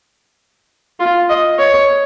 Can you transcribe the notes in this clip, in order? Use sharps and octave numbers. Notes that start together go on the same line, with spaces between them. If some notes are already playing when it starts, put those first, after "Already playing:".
F4
D#5
C#5